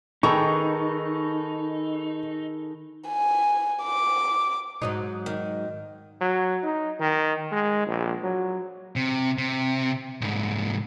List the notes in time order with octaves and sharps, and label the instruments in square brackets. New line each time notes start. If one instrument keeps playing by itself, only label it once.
[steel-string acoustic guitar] D#3 [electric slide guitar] D#4 [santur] G#4 A4 B4 [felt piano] C#6
[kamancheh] G#5
D6
[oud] G#2 F#3 D#4
[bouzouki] D#3
[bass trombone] F#3
D#4
D#3
G#3
A#1
F#3
[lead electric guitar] C3
C3
C2 G#2